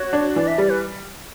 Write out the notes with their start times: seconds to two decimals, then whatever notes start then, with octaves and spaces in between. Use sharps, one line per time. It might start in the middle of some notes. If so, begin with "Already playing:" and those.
Already playing: F#4 C#5
0.13 D4
0.36 E3 D5
0.48 E5
0.58 G3 D5
0.70 B4